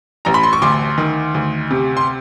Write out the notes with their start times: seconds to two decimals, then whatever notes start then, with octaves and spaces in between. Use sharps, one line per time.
0.25 A1 A#5
0.34 B5
0.43 C6
0.53 C#6
0.62 D2 C6 D6
0.98 D#3
1.34 D2
1.71 C3
1.97 C6